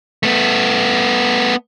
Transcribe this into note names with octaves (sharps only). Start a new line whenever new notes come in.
A3 B3